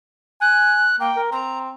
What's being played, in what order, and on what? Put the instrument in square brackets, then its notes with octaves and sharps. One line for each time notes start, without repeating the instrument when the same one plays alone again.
[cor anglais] G#5 [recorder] F#6
[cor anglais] A#3 [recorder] G5
[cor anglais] A#4
[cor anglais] C4 [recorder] A#5